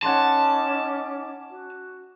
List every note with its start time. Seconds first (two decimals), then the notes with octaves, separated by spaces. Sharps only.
0.02 C#4 D#4 F#5 G#5 A5 C6 D6
1.49 F#4